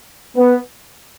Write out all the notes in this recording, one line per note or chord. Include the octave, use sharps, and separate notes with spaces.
B3